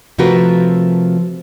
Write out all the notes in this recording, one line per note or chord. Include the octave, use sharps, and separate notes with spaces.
C3 F3 A3 F#4 A#4 B4